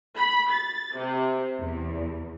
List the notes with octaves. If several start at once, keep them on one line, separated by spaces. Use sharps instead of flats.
B5
A6
C3
E2